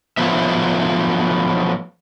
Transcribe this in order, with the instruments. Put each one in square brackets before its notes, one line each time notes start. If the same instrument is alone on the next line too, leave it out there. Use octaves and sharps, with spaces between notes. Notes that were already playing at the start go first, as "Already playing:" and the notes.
[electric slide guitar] F3 F#3 A3 B3 E5